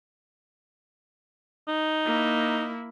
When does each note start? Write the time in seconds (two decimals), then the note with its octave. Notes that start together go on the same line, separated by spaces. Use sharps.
1.68 D#4
2.05 A#3 E4